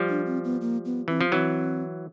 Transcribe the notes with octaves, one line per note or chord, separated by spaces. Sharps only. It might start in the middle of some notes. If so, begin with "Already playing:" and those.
Already playing: F3 G3
D4
C4
B3
A#3
B3
E3 C4
F3
E3 F#3 C4